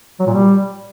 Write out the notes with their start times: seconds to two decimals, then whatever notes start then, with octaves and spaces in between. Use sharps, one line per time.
0.20 F#3
0.27 A#2
0.34 G3